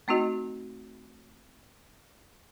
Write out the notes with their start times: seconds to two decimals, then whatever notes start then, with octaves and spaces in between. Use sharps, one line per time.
0.08 A3 C4 D#4 F#4 D#5